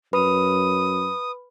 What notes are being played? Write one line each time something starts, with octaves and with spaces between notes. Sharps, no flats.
F#2 B4 B5 D#6